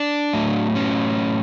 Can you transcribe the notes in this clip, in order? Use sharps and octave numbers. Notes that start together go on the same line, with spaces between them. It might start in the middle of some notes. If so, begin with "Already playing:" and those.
Already playing: D4
A2 F#3 A3
C#4